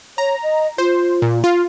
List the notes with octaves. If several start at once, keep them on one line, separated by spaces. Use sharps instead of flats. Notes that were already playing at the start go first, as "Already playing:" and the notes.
C#5 A#5
D#5
F4 C5
A#2
F4